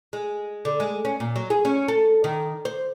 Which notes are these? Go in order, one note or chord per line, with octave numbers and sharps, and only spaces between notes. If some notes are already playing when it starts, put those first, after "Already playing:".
G#3
D3
G#3
C#4
A#2
F#3
G#4
C#4
A4
D#3
C5